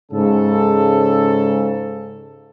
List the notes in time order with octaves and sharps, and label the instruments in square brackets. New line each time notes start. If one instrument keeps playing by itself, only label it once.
[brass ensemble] G#2 C#3 A4